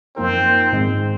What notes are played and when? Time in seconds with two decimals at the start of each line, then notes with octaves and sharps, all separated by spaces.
0.16 F#2 F3 A#3 C4 D#4 A#4
0.73 G#2 D#3 G#3 C4